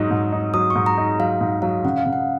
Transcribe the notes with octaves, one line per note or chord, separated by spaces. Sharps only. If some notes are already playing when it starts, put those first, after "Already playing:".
Already playing: G#2 F#3 D#4 C#6
G#2
D#4
F#3 D#6
C#6
G#2
A#5
D#4
F#3 F5
G#2
F#3 F5
C#3 F#5
F5
C#3
F#5